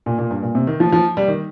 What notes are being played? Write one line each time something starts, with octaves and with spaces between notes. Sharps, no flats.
A#2
A#2
G2
A#2
C3
D#3
F3
F3
G3
D#3